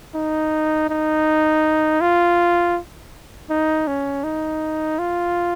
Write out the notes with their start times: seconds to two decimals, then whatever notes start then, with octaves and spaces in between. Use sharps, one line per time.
0.15 D#4
0.90 D#4
2.01 F4
3.50 D#4
3.87 C#4
4.24 D#4
4.99 F4